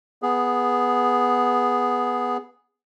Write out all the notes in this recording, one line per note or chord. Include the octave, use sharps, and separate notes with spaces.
B3 G#4